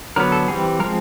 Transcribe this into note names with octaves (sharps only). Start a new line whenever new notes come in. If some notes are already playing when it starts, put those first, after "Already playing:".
D3 F#3 B3 A#4
A4
E3 G3 C4 G#4
F3 G#3 C4 A#4